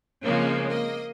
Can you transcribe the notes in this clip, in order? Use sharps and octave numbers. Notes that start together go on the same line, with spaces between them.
C#3 F3 G#3 A#3 C4 C#4
A#3 D#5